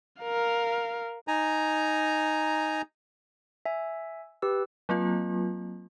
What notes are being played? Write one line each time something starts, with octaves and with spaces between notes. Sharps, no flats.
A#4 F5
D#4 G#5 A#5
E5 G#5
G4 B4 E6
F#3 A#3 C4 F4